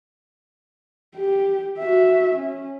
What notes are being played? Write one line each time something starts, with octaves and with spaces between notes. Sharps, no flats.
G4
F#4 E5
C#4